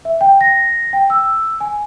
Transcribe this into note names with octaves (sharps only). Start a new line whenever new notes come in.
E5
G5
A#6
G5
E6
G#5